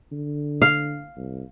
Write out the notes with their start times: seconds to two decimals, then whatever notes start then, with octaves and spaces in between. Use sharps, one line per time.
0.12 D3
0.62 F5
1.17 C2